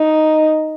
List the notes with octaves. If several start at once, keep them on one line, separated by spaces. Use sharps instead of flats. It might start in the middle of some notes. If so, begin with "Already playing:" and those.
Already playing: D#4